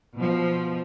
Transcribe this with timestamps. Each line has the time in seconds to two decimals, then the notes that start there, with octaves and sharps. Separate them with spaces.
0.17 B2 F3